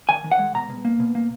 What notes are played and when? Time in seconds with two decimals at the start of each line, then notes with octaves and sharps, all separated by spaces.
0.09 D#3 G#5
0.24 D#3
0.32 F#5
0.39 G#3
0.54 B2 A#5
0.70 B2
0.85 A#3
1.00 B2
1.15 A#3